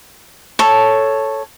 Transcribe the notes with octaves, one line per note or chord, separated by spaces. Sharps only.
A4 C#5